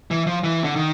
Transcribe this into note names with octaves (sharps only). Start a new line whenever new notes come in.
E3
F3
E3
D3
D#3